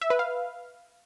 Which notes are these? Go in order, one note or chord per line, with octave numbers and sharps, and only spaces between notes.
E5
B4
F5